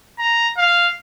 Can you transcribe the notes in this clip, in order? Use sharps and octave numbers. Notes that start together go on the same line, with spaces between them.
A#5
F5